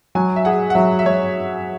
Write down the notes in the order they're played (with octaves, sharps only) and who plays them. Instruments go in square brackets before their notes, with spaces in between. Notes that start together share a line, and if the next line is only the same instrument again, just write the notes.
[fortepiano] F#3 [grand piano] G#5
[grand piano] E5
[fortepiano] G#4 [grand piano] F#5
[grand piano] F#5
[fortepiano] F#3 [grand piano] E5
[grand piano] E5
[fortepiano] F#3 [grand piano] C#5